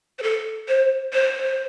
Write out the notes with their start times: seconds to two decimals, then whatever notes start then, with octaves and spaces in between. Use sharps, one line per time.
0.19 C5
0.23 A4
0.68 C5
1.13 C5